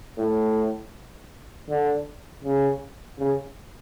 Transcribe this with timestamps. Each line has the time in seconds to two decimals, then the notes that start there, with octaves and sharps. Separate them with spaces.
0.18 A2
1.70 D3
2.45 C#3
3.20 C#3